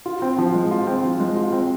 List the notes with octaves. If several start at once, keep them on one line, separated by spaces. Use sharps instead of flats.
F4
C4
F3
G#3
F4
C4
F3
G#3
F4
C4